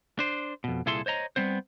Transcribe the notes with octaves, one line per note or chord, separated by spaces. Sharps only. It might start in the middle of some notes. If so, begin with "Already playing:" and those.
D4 C5
F2 B2
C2 A#2 E4 G#4 A4 C6
C5 C#5 D#5 A#5
G3 B3 C4 C5